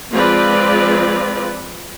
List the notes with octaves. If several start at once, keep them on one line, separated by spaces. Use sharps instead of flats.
F3 G#3 C4 F4 B4 D5